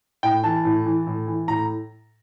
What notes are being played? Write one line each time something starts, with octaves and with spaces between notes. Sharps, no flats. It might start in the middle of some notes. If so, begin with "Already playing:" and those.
A2 G5
E3 A5
A2
E3
A2
E3
A2 A#5